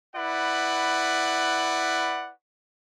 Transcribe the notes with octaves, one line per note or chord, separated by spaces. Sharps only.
E4 B4 D5 F#5